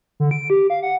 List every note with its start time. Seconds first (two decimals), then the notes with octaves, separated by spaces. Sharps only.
0.20 D3
0.31 D7
0.50 G4
0.70 F5
0.82 F#5